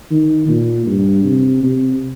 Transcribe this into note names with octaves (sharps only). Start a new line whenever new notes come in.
D#3
A#2
G2
C3
C3